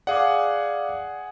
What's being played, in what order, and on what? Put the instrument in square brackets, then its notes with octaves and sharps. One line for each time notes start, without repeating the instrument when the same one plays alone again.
[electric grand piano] G#4 F#5 [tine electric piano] D5 F5 D6